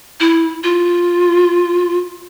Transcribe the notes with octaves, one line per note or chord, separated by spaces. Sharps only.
E4
F4